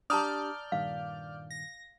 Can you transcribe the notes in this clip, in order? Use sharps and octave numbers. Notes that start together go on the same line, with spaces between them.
D4 G4 D5 A5 A#5 D#6 F6 G6
G2 A#2 D#3 F5
A#6